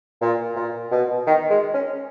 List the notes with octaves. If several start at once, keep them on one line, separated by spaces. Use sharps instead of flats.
A#2
A#2
B2
D#3
G#3
C#4